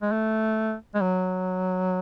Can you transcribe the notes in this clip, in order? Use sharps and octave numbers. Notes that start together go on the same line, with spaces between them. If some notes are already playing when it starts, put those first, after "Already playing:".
G#3
A3
G#3
F#3